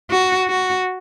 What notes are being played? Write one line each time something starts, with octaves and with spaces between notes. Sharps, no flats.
F#4
F#4